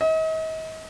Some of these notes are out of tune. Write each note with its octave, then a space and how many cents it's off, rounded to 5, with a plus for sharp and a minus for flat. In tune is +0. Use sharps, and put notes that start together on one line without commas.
D#5 +40